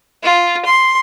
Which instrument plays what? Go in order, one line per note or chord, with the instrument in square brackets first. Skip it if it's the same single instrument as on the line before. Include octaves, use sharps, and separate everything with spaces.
[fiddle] F4
C6